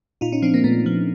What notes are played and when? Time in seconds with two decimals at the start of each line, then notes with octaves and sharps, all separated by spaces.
0.21 A#2 D#4 F4
0.32 C#4 D#4
0.42 F3 C4 D4
0.54 A#3 C4
0.64 A#2 A3 B3
0.86 F3